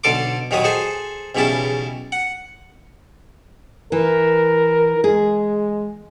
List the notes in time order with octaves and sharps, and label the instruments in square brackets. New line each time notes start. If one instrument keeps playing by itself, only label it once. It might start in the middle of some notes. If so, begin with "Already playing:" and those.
[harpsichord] B1 D3 A4 C6 D6
D#2 A#2 D#3 F#3 B4 D#6
G#4 A4 C5 G#5
B1 E2 C#3 G3 E4 A5
F#5
[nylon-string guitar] E3 [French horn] A#4
[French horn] G#3 [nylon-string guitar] G#4